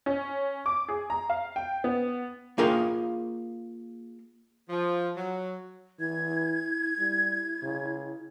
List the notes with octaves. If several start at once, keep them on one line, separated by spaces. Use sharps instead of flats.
C#4
D6
G#4
A#5
F5
G5
B3
A#3 F4 G#4 A#4 F5 G5
F3
F#3
E3 E4 G#6
G3 E4
C#3